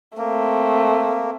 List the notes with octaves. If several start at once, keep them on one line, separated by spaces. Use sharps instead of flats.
A3 A#3 C4